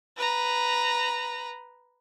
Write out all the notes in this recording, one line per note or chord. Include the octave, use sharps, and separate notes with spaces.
B4 A#5